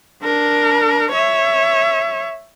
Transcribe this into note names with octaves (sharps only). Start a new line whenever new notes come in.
D4 A#4
C#5 E5